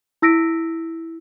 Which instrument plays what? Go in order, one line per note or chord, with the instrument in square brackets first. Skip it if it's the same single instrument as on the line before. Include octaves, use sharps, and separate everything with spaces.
[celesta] E4 E6 A#6 B6 D7